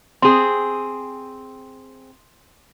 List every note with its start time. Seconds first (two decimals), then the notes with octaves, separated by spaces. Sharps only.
0.22 C4 G#4 C6